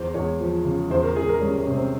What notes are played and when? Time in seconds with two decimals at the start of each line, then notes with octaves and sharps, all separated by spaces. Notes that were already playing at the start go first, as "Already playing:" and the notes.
Already playing: E2 C5
0.14 E2 C#5
0.40 F3
0.65 C#3
0.90 E2 C5
1.03 A#4
1.16 E2 G#4
1.29 A#4
1.41 G3 C#4
1.59 C#4
1.67 C3
1.75 C4